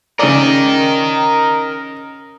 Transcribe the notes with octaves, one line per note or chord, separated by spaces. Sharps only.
C#3 C#4 A#4 D5 D#5